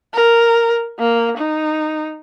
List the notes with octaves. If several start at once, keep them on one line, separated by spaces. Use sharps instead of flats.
A#4
A#3
D#4